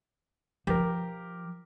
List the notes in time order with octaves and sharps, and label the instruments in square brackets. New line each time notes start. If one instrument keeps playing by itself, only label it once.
[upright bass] F3 [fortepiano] G4 A#4